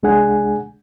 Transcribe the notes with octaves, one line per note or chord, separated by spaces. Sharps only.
C2 G#3 D4 G#4 F#5 G#5